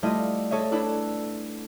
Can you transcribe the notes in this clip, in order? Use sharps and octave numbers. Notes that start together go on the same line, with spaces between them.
G3 A3 E4 F4 D#5
A4 C#5 D#5 E5
D4 E4 A4 B4